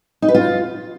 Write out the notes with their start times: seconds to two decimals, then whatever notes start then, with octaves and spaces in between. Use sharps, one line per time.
0.22 D#4
0.28 B4
0.35 F4